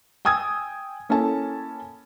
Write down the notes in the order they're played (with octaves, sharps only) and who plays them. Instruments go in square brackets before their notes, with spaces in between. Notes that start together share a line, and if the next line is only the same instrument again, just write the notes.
[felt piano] G5 G#5 D#6 E6 G#6
A#3 C#4 E4 A4 G#5 A5